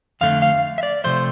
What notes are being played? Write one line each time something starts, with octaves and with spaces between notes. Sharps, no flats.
F2 D3 A3 D4 F5
F5
E5
D5
C3 F3 A3 C5